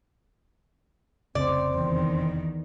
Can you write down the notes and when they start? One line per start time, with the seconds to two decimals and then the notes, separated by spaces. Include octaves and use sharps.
1.35 F1 C2 C#3 C4 D5
1.73 E2 D#3